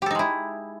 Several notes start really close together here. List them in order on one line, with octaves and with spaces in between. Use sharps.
G4 A4 D#4 G#3 E4